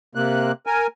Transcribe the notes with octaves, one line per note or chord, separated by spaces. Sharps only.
C3 A#3 F#6
A#4 G#5